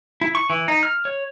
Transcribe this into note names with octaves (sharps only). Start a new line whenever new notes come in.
E4
C#6
E3
D#4
F6
C#5